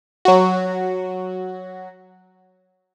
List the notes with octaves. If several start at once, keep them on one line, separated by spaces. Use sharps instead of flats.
F#3 F#4